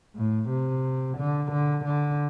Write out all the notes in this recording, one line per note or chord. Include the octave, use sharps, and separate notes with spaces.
A2
C3
D3
D3
D3